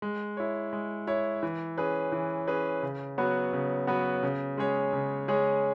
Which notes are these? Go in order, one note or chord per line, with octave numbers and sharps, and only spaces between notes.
G#3
E4 C#5
G#3
E4 C#5
E3
C#4 G#4 B4
E3
C#4 G#4 B4
C#3
F#3 B3 F#4 B4
C#3
F#3 B3 F#4 B4
C#3
G#3 C#4 G#4 C#5
C#3
G#3 C#4 G#4 C#5